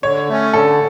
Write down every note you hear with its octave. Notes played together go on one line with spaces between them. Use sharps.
D3 C#5
A3 C#4
D3 A4